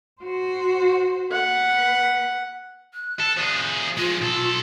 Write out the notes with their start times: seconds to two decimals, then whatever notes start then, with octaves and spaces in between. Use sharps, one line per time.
0.22 F#4 C5
1.32 B4 F#5
2.93 F#6
3.19 A4
3.37 F3 G#4
3.97 F3 G#3 F4
4.21 B1 A4